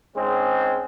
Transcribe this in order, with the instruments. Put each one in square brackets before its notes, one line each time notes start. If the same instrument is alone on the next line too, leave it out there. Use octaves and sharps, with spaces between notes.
[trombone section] G#2 G#3 C4 C#4